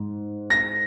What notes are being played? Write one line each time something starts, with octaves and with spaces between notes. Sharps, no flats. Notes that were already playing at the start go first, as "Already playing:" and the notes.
Already playing: G#2
A#6